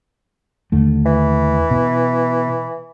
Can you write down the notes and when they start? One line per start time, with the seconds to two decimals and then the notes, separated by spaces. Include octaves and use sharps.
0.72 D#2 D3 A3
1.06 E3
1.71 B2